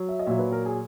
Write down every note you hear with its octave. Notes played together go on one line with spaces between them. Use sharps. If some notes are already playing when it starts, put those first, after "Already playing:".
Already playing: F#3
E5
D#5
A#2 F#3 E5
B4
A#4
G#4